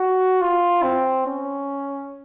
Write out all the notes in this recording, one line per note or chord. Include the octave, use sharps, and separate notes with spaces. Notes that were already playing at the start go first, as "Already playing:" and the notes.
Already playing: F#4
F4
C4
C#4